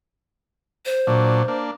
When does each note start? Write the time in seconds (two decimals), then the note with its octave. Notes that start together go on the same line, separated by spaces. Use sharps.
0.86 C5
1.07 A#2 F#3 D4
1.48 A#3 D4